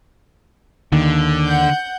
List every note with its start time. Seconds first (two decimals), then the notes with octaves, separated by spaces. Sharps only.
0.92 D#2 D3 D#3
1.46 F#5 G6